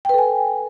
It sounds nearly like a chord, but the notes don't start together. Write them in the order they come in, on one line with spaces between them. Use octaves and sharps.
G5 B4 A4 G#5